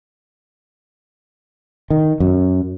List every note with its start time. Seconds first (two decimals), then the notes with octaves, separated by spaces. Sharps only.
1.90 D#3
2.20 F#2